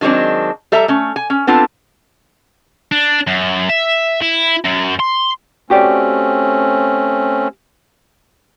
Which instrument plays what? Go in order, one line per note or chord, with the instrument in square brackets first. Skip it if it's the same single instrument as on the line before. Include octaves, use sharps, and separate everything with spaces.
[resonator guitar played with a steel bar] D#3 F#3 G#3 C4 D4
G3 A4 E5 A#5
A3 C#4
G#5
C#4
B3 C4 D4 F4 A4
[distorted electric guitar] D4
F#2
E5
E4
F#2
C6
[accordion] A3 C4 C#4 [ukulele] F#4 G4 D5